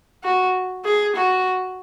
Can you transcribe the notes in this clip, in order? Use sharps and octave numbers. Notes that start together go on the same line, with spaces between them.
F#4
G#4
F#4